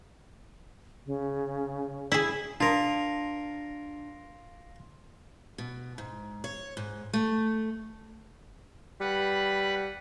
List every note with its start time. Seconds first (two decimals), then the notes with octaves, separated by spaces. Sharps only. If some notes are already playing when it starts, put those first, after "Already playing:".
1.06 C#3
2.12 E4 G#4
2.60 D4 F4 A#4
5.58 B2
5.98 G#2
6.44 C#5
6.77 G#2
7.13 A3
9.00 G3 B4 F#5